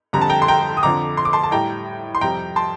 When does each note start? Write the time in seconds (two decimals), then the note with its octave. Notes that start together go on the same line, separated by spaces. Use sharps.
0.13 F2 D3 G3 A#5
0.21 A5
0.29 G5 A#5
0.42 C6
0.48 G5 A#5
0.77 D#6
0.83 F2 D3 F3 A#5 D6
1.17 C6
1.25 D6
1.33 A5 C6
1.43 A5
1.52 A2 G3 G5 A#5
2.15 C6
2.21 F2 C3 G3 G5 A#5
2.56 A5 C6